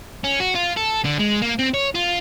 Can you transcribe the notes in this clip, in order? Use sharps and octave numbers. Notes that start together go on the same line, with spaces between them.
C#4
F#4
F4
A4
D3
G#3
A#3
C4
C#5
F4